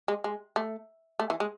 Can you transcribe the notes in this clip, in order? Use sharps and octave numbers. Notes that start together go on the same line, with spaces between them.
G#3
G#3
A3
A3
E3
G#3